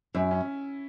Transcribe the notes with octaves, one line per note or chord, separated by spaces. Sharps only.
F#2 E4
C#4